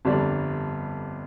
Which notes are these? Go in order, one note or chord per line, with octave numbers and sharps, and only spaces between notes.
G1 F2 D3 G3 D4